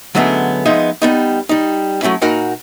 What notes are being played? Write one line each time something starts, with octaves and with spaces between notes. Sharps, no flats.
D3 F#3 G#3 A3 B3 C#4
F3 G#3 B3 D#4 E5
G3 B3 D#4
G3 D#4
F#3 A3 C#4 E4
A#2 D#4 F#4 A#4 F#5 B5